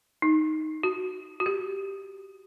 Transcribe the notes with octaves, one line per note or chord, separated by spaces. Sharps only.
D#4
F#4
F#4
G4